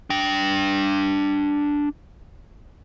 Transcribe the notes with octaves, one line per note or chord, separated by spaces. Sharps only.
D4 G5